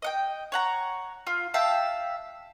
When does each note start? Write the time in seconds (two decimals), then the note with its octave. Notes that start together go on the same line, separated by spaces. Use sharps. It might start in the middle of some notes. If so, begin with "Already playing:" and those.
0.02 D#5 F#5 G5
0.52 C#5 F#5 A#5
1.27 F4
1.54 E5 F5 G5 A5